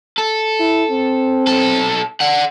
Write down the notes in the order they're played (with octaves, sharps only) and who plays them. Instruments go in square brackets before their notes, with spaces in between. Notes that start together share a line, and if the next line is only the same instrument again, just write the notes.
[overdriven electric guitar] A4
[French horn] E4
C4
[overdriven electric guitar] B1 A4
D5 F#5